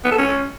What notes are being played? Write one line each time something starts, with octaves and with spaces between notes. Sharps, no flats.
B3
A4
C#4